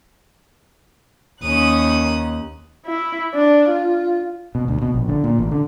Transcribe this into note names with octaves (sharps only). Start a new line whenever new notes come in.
D#2 C#4 D#6 F#6
E4
D4
F4
B2
D2
B2
A#1
D3
A#2
A1
D3